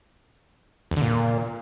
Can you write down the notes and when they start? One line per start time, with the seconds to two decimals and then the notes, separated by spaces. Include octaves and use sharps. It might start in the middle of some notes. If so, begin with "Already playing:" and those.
0.91 E2
0.96 D3
1.02 A#2